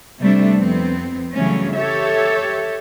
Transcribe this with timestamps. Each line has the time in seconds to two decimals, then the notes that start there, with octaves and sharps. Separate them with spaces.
0.19 C3 G3 A3 D4
0.58 F2 B3 C4
1.33 C#3 E3 F#3 G3 A3 C#4
1.74 G4 A4 C#5 E5